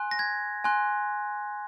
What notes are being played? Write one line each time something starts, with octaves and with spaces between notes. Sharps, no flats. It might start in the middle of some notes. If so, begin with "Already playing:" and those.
Already playing: G#5 C6 F#6
A#6
G#6
G#5 C6 F#6